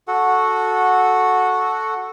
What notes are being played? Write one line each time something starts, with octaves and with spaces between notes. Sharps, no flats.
F#4 A4 F#5